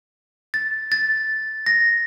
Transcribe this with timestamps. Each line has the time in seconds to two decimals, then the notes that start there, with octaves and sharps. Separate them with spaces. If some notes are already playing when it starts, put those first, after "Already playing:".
0.54 A6
0.92 A6
1.66 A#6